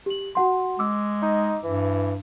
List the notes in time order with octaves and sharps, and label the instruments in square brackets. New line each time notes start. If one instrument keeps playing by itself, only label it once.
[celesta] G4 F#7
F#4 F#5 C6
[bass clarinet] G#3 [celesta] D6 E6
[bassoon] D#4
[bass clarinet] G2 [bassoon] E3